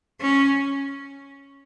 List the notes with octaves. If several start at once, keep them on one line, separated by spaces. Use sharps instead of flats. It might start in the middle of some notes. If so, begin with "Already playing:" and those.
C#4